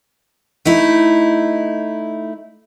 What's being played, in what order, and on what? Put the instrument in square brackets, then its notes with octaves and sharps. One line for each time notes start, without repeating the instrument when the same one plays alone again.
[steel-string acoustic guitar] A3 D#4 E4